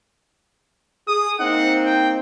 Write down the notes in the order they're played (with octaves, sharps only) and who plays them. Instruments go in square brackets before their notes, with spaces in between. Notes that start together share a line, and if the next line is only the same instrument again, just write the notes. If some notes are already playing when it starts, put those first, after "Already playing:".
[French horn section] G#4 [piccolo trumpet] D#6
[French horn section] A#3 C4 D#4 [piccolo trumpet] F#5
[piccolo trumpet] G5